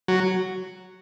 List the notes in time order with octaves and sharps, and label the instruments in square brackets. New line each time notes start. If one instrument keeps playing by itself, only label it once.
[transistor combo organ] F#3